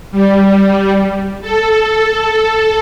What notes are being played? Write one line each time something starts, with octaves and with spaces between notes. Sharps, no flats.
G3
A4